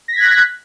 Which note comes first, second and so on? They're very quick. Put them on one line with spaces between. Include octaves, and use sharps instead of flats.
A#6 B6 G#6 F#6